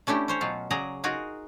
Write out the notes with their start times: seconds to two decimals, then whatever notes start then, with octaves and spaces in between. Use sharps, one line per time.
0.07 A3 C#4 D4 E4 G4
0.28 C#4 C5 C#5
0.41 B2 F#3 F4
0.70 C#3 F#3 G#4 D5 G#5 A#5
1.04 D#4 F4 F#4 G#4 A#4 G#5